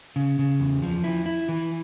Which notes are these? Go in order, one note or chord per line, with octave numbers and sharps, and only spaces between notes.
C#3
C#3
E2
F3
E4
E4
E3